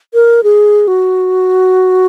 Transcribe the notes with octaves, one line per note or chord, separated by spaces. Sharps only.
A#4
G#4
F#4